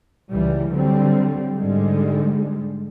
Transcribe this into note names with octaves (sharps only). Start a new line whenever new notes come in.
C#2 E3 G3
D3 F#3 G3 C4
G#2 D3 G3 G#3